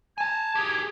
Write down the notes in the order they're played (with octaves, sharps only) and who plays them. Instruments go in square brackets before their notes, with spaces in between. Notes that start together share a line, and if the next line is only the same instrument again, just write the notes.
[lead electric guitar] G#5 A5 [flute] G#6
[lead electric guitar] G4 G#4